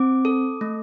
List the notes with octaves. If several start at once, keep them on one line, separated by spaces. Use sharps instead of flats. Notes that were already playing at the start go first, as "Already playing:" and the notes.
Already playing: C4 D6
A4
A3